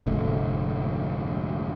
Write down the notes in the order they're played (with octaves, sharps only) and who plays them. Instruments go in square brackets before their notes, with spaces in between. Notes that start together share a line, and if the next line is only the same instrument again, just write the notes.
[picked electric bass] F1 D2 G#2 A3